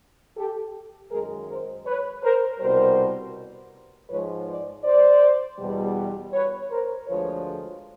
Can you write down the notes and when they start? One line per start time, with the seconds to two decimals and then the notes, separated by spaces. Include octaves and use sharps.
0.37 G4 A4
1.11 F#2 D#3 G#3 G#4 A#4
1.49 A#4 C5
1.86 B4 C#5
2.23 A#4 C5
2.60 C2 B2 G3 A#4 C5
4.10 G#2 F3 G#3 B4 C#5
4.47 C5 D5
4.84 C5 D5
5.59 E2 B2 G3
6.33 B4 C#5
6.70 A#4 C5
7.07 D2 D3 F3 G#3 B4 C#5